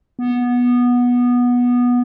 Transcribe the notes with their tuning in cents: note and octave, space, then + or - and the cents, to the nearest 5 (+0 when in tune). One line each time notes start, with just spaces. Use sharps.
B3 -15